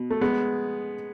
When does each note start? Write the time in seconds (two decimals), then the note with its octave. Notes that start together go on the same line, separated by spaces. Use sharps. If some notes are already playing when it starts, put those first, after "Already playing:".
Already playing: B2
0.11 A3
0.21 G#3 B3